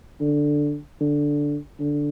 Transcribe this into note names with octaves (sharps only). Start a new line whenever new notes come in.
D3
D3
D3